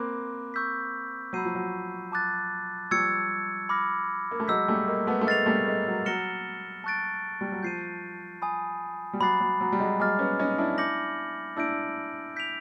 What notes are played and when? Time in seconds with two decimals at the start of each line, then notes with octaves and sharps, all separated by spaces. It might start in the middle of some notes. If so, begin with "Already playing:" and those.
Already playing: A#3 C4 B5 D6 F#6
0.54 C#6 E6 G6 B6
1.33 F#3 B5 E6 G6 C7 D#7
1.45 F3
1.55 F#3
2.12 A5 D6 F#6 A6
2.91 F3 G3 C#6 E6 G#6 C#7
3.69 B5 D6 F6 A#6
4.31 A#3
4.40 A3
4.48 F#3 G#3 E6 G6 B6
4.68 G3 A3
4.87 G#3 A#3
5.07 A3 B3
5.21 A3
5.27 G#3 A#3 F6 A6 C7 F7
5.46 G3 A3
5.67 G#3 A#3
5.87 F#3
6.05 F#3 F6 A#6 C#7 E7 G7
6.84 A5 C#6 F#6 A6 D7
7.41 G3
7.52 F#3
7.63 F3 G6 C7 D#7
8.42 G#5 B5 D#6
9.13 G3
9.20 F#3 B5 D6 F#6 A6 C7
9.40 F#3
9.61 F#3
9.72 G3
9.79 F#3 G#3
9.99 F#3 G#3 G#5 B5 D6 F6 A6
10.19 B3 C#4
10.40 C#4 D#4
10.58 D4 E4
10.78 D6 G6 A#6 C#7 F#7
11.56 D4 E4 E6 G6 A#6 D7
12.36 G6 B6 D7 F7